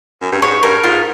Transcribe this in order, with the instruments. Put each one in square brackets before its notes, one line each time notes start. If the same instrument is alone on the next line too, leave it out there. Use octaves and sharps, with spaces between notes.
[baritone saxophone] F#2
G2
[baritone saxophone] G#2 [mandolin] C#5
[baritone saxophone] G2 [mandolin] A#4
[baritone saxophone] G#2 [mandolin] F4